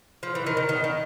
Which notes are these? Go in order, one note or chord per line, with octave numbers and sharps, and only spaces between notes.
F3
E3
D#3
D#3
D#3
D#3